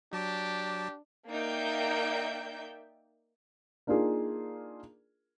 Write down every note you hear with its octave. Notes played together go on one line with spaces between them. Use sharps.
F#3 D4 G4 A5 D6
A#3 D#4 D5 E5 G5 G6
A#3 D4 D#4 F4 G#4 A#4